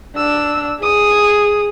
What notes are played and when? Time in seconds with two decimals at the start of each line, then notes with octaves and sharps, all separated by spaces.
0.17 D4 E6
0.82 G#4 D#6